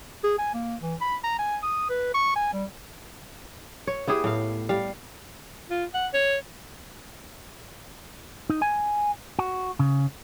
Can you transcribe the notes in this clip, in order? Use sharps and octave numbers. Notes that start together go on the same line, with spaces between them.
G#4
G#5
A#3
E3
B5
A#5
G#5
D#6
B4
C#6
G#5
G3
C#5
B3 E4 G4 G#4
A2 F5
G3 F5
F4
F#5
C#5
D#4
G#5
F#4
C#3